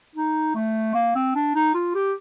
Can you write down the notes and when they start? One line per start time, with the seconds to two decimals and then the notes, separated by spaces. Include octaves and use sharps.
0.15 D#4
0.55 A3
0.94 A#3
1.15 C4
1.35 D4
1.55 D#4
1.74 F4
1.95 G4